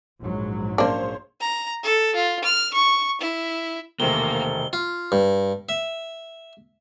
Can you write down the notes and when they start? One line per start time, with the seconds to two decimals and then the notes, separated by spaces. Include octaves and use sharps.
0.21 A#1 G#2 F#3
0.78 G#3 A#3 C#4 D4 C5
1.41 A#5
1.83 A4
2.15 F4
2.44 F6
2.73 C#6
3.21 E4
4.00 E1 C3 D#3 A3 A#3 A#4 G7
4.73 F4
5.12 G2
5.69 E5